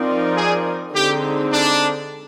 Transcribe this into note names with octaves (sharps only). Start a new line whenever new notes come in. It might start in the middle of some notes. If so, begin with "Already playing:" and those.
Already playing: F3 C4 D#4 A#4 D5
G#4
D3 G#3 C4 D#4 G4
D4